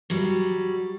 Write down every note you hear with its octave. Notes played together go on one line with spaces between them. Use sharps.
F#3 G3